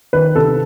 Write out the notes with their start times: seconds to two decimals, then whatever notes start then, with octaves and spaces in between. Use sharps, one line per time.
0.13 D#3 B4
0.35 C3 A4